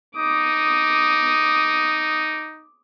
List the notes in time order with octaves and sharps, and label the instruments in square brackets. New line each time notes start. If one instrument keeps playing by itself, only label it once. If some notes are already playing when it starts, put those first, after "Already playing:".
[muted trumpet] D#4 [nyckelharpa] D6 D#6